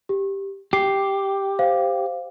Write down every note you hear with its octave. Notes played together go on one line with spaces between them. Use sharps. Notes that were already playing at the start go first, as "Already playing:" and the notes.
G4
G4 C7
C5 F5